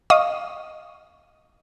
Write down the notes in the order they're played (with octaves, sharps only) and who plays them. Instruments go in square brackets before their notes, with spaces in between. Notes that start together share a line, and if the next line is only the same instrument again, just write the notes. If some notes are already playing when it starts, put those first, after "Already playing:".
[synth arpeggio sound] D#5 F5 C#6 D#6